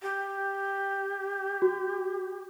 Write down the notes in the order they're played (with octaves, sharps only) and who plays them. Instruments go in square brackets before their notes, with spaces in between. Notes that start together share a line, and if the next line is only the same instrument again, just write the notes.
[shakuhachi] G4
[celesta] F#4